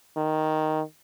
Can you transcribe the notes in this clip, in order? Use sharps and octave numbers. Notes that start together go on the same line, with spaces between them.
D#3